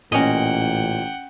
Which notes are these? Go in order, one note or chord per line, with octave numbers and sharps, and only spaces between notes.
A1 A#2 C#4 D#5 F#5 G5